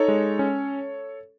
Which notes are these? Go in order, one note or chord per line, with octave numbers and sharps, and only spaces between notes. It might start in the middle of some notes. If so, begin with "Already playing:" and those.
Already playing: D#4 A4 C#5
G#3
C#4